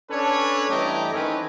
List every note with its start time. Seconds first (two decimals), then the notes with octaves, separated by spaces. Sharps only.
0.11 C#4 D4 A4 B4 C#5
0.69 G2 E3 A3 G4 D#5 A#5
1.13 D#3 E3 A3 C4 C#4 B4